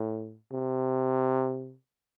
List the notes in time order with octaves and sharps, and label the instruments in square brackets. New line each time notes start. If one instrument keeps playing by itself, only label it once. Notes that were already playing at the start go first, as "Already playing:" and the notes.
Already playing: [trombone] A2
C3